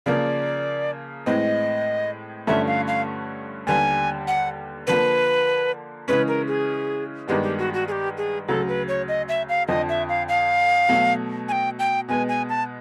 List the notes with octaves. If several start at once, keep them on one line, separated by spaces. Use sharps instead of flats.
C#3 F3 A#3 D5
A2 E3 G#3 C4 D#5
G2 D3 F3 A3 C#4 E5
F5
F5
D#2 D3 G3 B3 G#5
F#5
D3 F3 A#3 B4
C#3 E3 G#3 C#4 B4
A#4
G#4
G2 D#3 G#3 B3 D4 G4
G4
F#4
F#4
G#4
G4
G#4
D2 C#3 F#3 A4
B4
C#5
D#5
E5
F5
F2 D3 F3 D#5
E5
F5
F5
B2 F#3 A3
G#5
G5
G5
B2 G#3 B3 G#5
G#5
A5